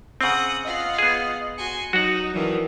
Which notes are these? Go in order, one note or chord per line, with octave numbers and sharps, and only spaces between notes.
C#3 C4 F#5 D#6
F4 D#5 F5 F#5
B3 G#4
F#4 G#5 C6 C#7
F#3 D#4 F#4 F#5
D#3 E3 F#3 D4